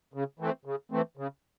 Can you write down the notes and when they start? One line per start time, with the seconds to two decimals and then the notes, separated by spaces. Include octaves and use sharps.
0.14 C#3
0.39 E3 A3 C4
0.66 C#3
0.92 E3 A3 C4
1.17 C#3